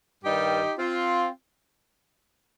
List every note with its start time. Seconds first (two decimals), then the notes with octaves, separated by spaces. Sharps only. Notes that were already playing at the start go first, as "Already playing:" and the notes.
0.23 G2 D#3 G3 D#4 G4
0.78 C4 F4